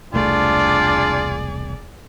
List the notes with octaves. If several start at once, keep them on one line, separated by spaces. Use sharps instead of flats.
E1 C2 A3 D4 F4 G#4 D5